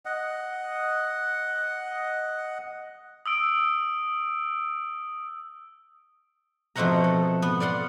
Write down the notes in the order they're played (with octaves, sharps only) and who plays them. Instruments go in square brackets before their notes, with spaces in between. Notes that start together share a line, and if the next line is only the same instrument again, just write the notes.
[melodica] D#5 F#5
[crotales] D#6 E6 D7
[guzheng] F2 B2 A3 C4 F#5 A#5
A4
B3
D5 F5 F#5 C6